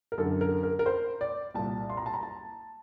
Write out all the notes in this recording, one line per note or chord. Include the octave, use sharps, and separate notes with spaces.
A#4
F#2 D3 A4
A#4
A#4
A#4
C5
D5
C2 A#2 A5
C6
A#5
A5
A#5
A5